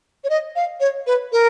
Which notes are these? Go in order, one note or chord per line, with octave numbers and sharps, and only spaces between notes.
C#5
D#5
F5
C#5
B4
A#4